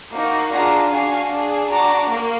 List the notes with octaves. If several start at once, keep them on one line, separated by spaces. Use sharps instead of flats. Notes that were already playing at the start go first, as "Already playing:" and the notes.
A#3 D#4 F#4
D4 F4 G#4 F#5 A#5
D4 F#4 F5 G#5
D4 G#4
D4 F#4 A#5 D6
A#3